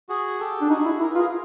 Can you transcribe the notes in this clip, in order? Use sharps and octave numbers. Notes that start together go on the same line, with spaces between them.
F#4 G#4
G4 A4
D4 A4
D#4 F#4 G#4
E4
E4 A#4
B4
F4
G#4 A#4